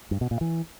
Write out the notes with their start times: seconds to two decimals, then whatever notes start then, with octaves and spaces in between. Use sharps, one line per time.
0.11 G2
0.21 B2
0.31 A#2
0.41 E3